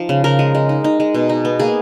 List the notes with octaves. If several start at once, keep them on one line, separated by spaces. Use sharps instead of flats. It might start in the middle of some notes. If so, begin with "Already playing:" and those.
Already playing: F3 D#4
C#3
C#3 A#4
G#3
G#3
D#4
D#4
G#3
B2
D#4
B3
A#3 G#4